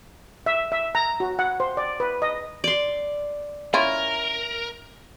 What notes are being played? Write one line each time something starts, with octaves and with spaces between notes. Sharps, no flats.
E5
E5
A#5
F#4
F#5
C5
D5
B4
D#5
D5 C6
C#4 E4 F4 A#4